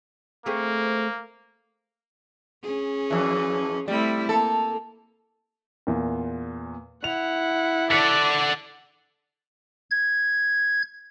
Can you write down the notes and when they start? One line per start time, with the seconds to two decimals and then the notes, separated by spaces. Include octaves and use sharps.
0.46 A3 A#3 C4 G#4
2.63 C#4 G#4
3.10 F2 E3
3.88 G3 A3 C4 E4
4.29 A#3 A4
5.87 E2 A#2
7.04 E4 F#5 F7
7.91 A4 D5 F#5 B6 C#7
9.90 G#6